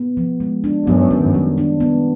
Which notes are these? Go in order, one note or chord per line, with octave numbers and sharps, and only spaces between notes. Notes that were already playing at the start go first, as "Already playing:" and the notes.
Already playing: B3
F3
G#3
D4
F#2 B3
D#3
G3
D4
B3